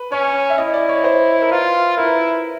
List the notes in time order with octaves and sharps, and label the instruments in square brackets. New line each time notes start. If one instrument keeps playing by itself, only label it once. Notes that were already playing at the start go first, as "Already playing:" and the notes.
Already playing: [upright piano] B4
[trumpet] C#4 [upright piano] C#5
[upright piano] E5
[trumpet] E4 [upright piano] D#5
[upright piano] D5
C#5
C5
A#4
[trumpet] F4 [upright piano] B4
[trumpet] E4 [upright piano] A#4
[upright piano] B4
A#4